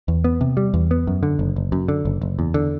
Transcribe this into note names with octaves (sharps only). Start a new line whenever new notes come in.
E2
B3
C3
G3
E2
B3
F#2
D3
F#1
F#1
F#2
D3
F#1
F#1
E2
D3